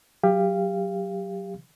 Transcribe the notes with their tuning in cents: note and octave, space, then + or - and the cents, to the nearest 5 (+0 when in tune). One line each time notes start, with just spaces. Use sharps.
F#3 +0 G4 +25 F5 -15